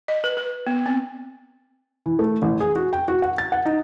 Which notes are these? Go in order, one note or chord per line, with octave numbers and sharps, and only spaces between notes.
D#5
B4
B4
B3
C4
E3
A3
A1
G#4
F#4
G5
F#4
F#5
A6
F#5
D#4